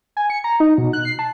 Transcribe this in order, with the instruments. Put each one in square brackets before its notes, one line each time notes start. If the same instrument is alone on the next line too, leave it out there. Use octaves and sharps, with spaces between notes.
[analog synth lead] G#5
C#7
A#5
D#4
B2
F#6
C7
A5